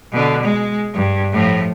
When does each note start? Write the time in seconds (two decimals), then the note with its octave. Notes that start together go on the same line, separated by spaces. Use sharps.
0.12 B2 D3
0.42 G#3
0.94 G2
1.32 A2 F3